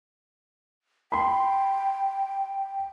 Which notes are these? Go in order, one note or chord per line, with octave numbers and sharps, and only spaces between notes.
G5 B5 C6